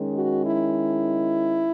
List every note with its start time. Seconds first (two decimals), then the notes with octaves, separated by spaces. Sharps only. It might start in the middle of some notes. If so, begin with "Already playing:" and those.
Already playing: D#3 G#3 C#4
0.13 F#4
0.44 E4